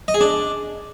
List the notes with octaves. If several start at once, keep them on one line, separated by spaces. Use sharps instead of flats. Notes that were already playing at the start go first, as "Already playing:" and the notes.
D#5
G#4
D4